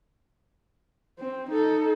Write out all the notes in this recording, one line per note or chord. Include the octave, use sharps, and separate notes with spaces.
C4
D#4 A4